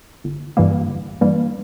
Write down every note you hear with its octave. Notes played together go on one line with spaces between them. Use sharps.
G1
G2 E3 G3 A#3
G1
G2 E3 G3 A#3